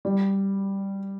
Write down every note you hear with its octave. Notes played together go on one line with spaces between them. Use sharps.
G3